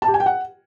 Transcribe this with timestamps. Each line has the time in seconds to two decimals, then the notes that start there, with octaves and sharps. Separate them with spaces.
0.02 A5
0.08 G4
0.14 G#5
0.20 G5
0.26 F#5